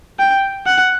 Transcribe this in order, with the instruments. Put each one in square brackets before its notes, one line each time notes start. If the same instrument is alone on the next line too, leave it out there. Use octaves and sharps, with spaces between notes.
[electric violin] G5
F#5